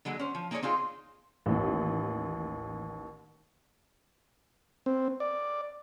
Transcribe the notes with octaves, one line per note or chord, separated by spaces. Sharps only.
D3 F#3 G#3 A#3
C#4 C5
F3
A#3 D#4 G#4 A#4 C#5 D5
C4 D#4 F4 G#4
A1 D#2
C4
D5